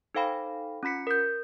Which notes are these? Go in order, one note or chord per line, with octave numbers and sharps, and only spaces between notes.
D#4 A4 C5 F5 G5 B5
C#4 F4 B5 B6 C#7
A#4 G6